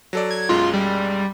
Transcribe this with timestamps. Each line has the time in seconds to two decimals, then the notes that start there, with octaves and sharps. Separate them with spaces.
0.13 F#3 A4 D5
0.31 G#6
0.49 B1 F#2 G#3 F4
0.73 G3